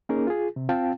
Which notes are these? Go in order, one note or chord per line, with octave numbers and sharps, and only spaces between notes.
A#3 C#4 D#4 G#4 A#4
F4 G#4
C3
C4 F4 F5 G5 A5